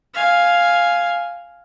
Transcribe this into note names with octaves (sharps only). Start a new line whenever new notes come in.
F5 G#5